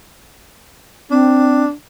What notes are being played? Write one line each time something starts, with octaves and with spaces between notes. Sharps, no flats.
C4 D4